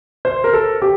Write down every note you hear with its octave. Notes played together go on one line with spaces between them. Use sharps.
C5
A#4
A4
G4